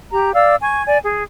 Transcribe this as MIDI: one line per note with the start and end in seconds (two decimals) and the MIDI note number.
0.11 0.31 67
0.11 0.31 82
0.35 0.54 74
0.35 0.54 77
0.35 0.54 88
0.62 0.84 80
0.62 0.84 85
0.62 0.84 92
0.86 0.99 74
0.86 0.99 80
1.03 1.23 68